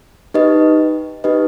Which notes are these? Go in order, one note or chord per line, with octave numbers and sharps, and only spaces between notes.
D#4 G4 B4 D#5
D#4 G4 B4 D#5